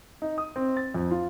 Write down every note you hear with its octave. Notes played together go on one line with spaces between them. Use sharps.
D#4
D#6
C4
A6
F2
F4